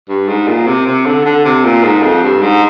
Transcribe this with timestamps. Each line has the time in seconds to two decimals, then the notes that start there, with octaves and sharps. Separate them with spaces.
0.09 G2
0.28 G#2
0.47 A#2
0.67 C3
0.86 C3
1.06 D3
1.25 D3
1.45 C3
1.64 A#2
1.83 G#2
2.02 F2
2.23 G2
2.42 G#2